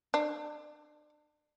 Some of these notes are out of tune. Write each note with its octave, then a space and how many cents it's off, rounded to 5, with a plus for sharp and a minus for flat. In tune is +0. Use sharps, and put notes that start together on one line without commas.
D4 +35